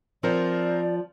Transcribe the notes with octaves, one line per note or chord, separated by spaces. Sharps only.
F3 C4 A#4 C5 D5